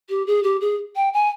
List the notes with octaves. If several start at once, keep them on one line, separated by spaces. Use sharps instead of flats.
G4
G#4
G4
G#4
G5
G#5